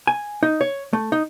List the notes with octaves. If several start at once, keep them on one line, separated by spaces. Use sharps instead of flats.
G#5
D#4
C#5
A3
D#4